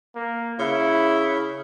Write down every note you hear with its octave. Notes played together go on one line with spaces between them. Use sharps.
A#3
C#3 E4